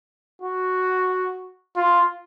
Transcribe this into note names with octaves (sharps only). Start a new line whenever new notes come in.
F#4
F4